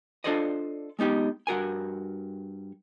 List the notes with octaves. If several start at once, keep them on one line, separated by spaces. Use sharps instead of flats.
D4 F4 A4 C5 D5 D#5
G#3 B3 D#4 G4
G2 F#4 A#4 G#5